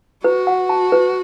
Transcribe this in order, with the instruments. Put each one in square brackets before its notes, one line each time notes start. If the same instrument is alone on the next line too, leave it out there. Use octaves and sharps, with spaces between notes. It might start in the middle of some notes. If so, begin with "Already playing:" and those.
[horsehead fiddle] F#4 [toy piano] B4
[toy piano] F#5
A5
B4